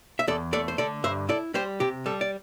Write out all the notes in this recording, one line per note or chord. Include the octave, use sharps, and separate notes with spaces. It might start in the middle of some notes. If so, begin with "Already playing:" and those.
E5
E2 A4 D5
A3 A4 D5
C5
D3 A4 D5
G2 C5 E5
E4 A4 D5
G3 G4 C5
C3 G4
G3 A4
D5